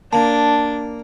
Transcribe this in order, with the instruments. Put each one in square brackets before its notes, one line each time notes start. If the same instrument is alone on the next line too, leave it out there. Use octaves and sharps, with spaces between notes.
[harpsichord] A#3 [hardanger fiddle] D4 [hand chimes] A5